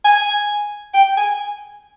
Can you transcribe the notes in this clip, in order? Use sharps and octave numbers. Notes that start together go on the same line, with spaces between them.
G#5
G5
G#5